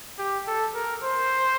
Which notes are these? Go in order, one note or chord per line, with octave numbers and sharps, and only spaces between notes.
G4
A4
A#4
C5